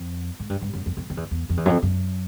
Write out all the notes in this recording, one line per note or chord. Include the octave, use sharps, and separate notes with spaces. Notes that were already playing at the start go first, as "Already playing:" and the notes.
Already playing: F2
G#2
G2
G2
F#2
F2
F2
F2
E2
E2
F2
E2
F#2
F2
F#2